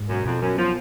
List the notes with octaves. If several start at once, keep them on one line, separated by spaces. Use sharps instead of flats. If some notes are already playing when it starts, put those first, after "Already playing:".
Already playing: G#2
F#2 B2
F2 B2
F#2 F#3
F3 B3